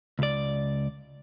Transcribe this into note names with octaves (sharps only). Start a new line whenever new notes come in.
C#2 D5